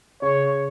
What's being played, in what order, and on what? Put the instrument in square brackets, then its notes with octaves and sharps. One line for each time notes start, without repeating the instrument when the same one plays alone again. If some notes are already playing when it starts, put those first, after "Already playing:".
[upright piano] C#3 [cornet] C#5